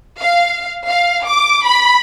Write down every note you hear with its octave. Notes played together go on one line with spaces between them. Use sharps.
F5
F5
D6
B5